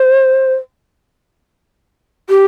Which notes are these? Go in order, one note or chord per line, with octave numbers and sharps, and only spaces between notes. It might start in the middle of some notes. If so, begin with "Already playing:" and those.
Already playing: C5
G4